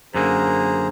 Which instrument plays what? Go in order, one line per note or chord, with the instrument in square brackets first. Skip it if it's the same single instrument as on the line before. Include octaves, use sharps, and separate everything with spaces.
[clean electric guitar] F#2 D3 A#3 [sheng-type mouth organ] G#4 C5 A#5